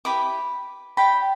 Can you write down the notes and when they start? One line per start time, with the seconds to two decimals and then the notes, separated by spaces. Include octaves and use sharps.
0.05 E4 G4 B4 B5 D6
0.97 G4 D5 G5 B5